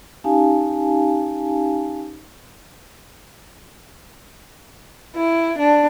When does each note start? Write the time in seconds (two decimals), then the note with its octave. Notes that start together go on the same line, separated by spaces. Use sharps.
0.24 C#4 D#4 G4 F5 G#5 A5
5.17 E4
5.59 D4